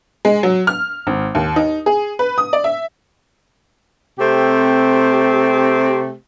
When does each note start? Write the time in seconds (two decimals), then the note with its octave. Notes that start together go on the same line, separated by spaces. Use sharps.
0.25 G#3
0.43 F#3
0.67 F6
1.07 G#1
1.35 D#2
1.56 D#4
1.86 G#4
2.19 B4
2.38 D#6
2.53 D5
2.64 E5
4.19 C3 A3 C4 G4